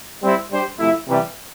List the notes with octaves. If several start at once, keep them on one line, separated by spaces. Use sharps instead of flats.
G3 C4 E4
G3 D4 G4 C5
C3 F3 A3 E4
C3 E3 G3